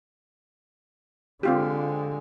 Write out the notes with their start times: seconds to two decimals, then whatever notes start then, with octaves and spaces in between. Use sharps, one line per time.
1.43 D3 G#3 C4 F4 G4